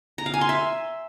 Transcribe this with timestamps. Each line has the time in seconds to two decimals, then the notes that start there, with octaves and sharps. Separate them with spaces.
0.18 A#5
0.26 F5
0.34 G#5
0.41 C6
0.49 E5